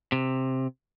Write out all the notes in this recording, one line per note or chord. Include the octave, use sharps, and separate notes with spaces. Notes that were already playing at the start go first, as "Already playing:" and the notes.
C3